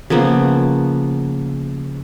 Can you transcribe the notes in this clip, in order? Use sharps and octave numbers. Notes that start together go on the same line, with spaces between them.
C#3 F3 A#3 B3